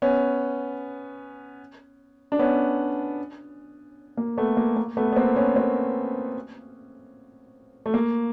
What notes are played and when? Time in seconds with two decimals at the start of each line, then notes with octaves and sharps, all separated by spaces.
0.02 B3 C#4
2.32 D4
2.39 B3 C#4
4.17 A#3
4.38 A3 B3
4.57 A#3
4.76 A#3
4.97 A3 B3
5.12 B3
5.16 A#3 C4
5.36 B3 C#4
5.56 A#3 C4
7.86 A3
7.94 A#3